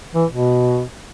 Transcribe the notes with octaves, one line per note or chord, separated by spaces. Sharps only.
E3
B2